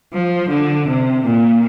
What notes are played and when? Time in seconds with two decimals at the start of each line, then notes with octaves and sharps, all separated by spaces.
0.12 F3
0.49 D3
0.87 C3
1.24 A#2